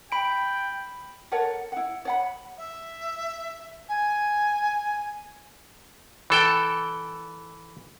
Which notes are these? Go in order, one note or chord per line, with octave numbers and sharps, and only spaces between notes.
G5 B5 D7
A4 A#4 C#5 F#5
E4 F#5
C#5 F#5 B5
E5
G#5
E3 A4 G5